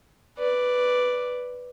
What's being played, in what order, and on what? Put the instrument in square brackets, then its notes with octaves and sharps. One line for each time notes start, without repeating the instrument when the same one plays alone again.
[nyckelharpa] B4 D5